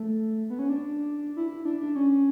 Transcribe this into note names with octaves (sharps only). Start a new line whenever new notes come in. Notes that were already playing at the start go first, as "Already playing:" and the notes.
Already playing: A3
B3
C#4
D4
E4
D4
D4
C#4